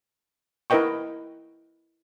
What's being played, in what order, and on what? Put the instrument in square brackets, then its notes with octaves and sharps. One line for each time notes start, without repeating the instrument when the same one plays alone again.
[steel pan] E4 A#4 B4 D#5 G5 C#6